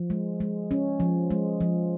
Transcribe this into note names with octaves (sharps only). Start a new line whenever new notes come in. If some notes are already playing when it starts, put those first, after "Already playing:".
Already playing: F3
G#3
G#3
C#4
F3
G#3
F3